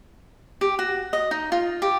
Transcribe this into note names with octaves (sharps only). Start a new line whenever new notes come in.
G4
F#4
D#5
D#4
F4
G4